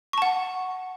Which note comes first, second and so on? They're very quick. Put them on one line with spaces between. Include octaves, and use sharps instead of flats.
C#6 A5 F#5